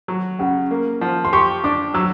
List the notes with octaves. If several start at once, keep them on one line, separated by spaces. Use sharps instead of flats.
F#3
C#3 F#5
A#3
F3
C6
G4 C#6
D4 D6
F#3 E6